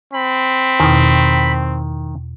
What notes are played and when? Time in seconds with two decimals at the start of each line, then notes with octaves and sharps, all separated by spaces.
0.13 C4 B5
0.80 E2 B2 D#3